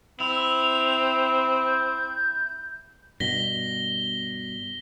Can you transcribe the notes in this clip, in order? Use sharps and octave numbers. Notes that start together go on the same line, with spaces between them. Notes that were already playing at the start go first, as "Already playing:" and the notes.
C4 E4 F7
G6
G2 B2 A#6 B6 G7